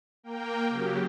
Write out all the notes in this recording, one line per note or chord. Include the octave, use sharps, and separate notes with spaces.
A#3 A#4 G5
C#3 F#3 G4